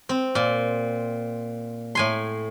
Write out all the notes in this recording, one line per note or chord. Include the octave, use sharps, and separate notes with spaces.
C4
A#2
A2 G#5 C6